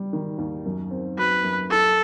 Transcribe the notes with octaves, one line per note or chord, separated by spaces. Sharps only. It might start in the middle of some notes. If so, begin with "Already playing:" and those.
Already playing: G3
D#3
D#2
F#2
C4
F#3 B4
F#2
E4 A4